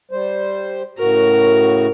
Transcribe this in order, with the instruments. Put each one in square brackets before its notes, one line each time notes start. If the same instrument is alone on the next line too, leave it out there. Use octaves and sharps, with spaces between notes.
[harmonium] G3 C5
[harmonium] A2 C#3 F#4 [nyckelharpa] A#4